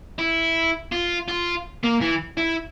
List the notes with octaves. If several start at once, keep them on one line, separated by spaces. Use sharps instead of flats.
E4
F4
F4
A#3
E3
E4